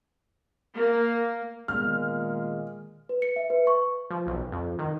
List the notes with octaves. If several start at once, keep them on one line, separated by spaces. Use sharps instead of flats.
A#3
A#2 D#3 G#3 B3 F6
B4
C#7
E5
B4
C#6
F3
B1
F2
D#3